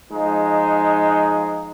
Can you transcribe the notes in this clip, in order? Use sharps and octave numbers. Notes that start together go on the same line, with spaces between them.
F3 G#3 D#4